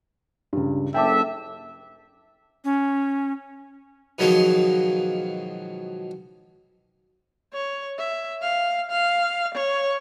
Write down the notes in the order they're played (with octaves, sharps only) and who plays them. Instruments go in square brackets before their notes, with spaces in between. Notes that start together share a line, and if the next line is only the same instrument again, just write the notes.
[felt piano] C#2 G2
[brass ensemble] F#1 A4 E5 [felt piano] G5 A5 D6
[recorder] C#4
[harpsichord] B2 D#3 F3 F#3 G#3 A#3
[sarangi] C#5
E5
F5
F5
C#5